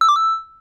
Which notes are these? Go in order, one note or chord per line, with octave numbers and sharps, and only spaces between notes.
E6
D6
E6